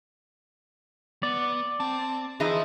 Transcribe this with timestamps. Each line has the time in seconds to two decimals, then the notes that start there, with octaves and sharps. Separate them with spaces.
1.23 B3 D5
1.80 C4 A5
2.40 E3 D#4 F4 G#4 C5 D#5